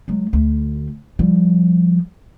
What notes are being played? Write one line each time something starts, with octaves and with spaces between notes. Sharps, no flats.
F#3 G#3
D2 A3
F3 G3